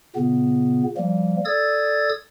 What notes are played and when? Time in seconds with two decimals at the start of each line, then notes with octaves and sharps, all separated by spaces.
0.16 A#2 C#3 B3
0.97 F3 G3 A#3
1.45 A4 D5 D#6 E6 G#6 A6